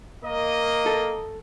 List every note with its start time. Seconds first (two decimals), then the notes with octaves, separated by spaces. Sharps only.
0.24 A#3 A#4 D#5
0.86 A4